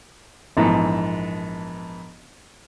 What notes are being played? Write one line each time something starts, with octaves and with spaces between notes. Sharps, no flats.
A#1 G#2 E3 B3 A4